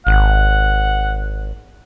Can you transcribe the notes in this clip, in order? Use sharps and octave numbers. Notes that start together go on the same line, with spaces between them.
G#1 F#5